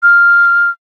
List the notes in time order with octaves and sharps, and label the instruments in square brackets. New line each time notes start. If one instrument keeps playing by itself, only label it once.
[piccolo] F6